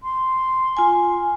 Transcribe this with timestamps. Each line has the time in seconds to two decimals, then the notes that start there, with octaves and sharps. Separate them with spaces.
0.03 C6
0.77 F4 G#5